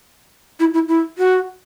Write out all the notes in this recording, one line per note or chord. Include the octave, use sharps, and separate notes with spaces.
E4
E4
E4
F#4